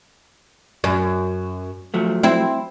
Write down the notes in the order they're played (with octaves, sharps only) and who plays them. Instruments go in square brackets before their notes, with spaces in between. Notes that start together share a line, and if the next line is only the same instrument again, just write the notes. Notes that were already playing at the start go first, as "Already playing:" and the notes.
[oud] F#2
[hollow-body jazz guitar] F3 F#3 A3
[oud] C4 E4